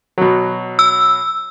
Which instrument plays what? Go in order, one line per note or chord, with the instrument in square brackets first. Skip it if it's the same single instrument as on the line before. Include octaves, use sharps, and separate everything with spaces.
[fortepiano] B2 F#3
[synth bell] E6